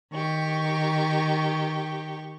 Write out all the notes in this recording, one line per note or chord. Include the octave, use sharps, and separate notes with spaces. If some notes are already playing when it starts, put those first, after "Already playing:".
D#3 G4 C#6